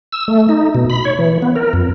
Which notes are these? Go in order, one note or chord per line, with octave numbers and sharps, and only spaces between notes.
E6
A3
D#4
B2
B5
C#5
E3
B3
A#4
F2